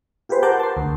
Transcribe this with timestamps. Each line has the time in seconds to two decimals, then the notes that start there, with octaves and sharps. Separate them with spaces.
0.29 F4 G4 G#4 B4 C5
0.43 A#4 C5 F#5 A5 D6 G6
0.60 A5 C6
0.77 D2